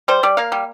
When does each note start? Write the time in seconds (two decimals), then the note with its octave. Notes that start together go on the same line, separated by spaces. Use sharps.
0.08 G3 C5
0.23 G3 D5
0.37 A#3 F5
0.52 G3